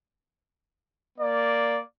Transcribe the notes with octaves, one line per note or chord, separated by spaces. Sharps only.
A#3 D5